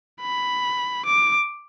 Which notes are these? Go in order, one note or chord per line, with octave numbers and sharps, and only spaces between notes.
B5
D6